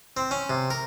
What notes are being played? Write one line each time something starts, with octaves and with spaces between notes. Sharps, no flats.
C4
C#4
C3
A#4